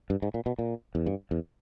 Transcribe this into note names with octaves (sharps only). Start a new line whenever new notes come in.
G2
G#2
A#2
B2
A#2
E2
G2
E2